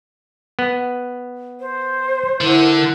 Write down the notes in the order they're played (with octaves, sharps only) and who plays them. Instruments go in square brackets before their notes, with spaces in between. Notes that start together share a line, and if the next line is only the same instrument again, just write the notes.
[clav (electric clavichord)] B3
[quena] C5
[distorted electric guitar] D3 [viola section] E4 A#4 F#5